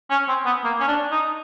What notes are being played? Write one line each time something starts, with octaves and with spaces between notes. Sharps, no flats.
C#4
C4
B3
A#3
C#4
D4
D#4